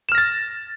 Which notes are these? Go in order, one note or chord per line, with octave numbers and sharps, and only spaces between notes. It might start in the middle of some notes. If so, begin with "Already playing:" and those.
F6 A6 A#6 E7